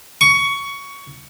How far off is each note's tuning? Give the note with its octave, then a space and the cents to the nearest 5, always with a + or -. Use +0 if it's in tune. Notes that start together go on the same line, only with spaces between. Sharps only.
C#6 +15